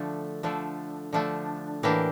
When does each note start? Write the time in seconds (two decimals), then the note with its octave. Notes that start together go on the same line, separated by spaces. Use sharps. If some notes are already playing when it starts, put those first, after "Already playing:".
Already playing: D3 F3 A3 D4
0.43 D3 F3 A3 D4
1.13 D3 F3 A3 D4
1.83 A2 E3 A#3 D4 G4